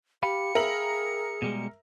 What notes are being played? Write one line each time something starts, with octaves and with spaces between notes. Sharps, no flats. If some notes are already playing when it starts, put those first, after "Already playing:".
G4 F5 G5 B5 C#7
G#4 A#4 E5 F#7
B2 G3 G#3